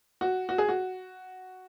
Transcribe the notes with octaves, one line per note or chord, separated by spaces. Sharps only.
F#4
F#4
G#4
F#4